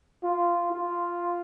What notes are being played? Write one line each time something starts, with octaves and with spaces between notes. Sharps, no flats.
F4
F4